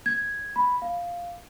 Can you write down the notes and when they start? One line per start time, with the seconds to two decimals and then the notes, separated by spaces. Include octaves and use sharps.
0.06 G#6
0.56 B5
0.82 F5